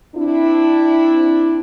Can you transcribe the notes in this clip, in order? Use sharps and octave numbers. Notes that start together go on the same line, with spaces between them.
C4 D4 E4